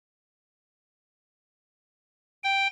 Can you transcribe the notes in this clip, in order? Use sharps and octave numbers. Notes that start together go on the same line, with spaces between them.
G5